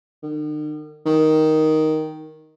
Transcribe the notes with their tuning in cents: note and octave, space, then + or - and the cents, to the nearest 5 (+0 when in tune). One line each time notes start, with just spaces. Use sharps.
D#3 -45
D#3 +5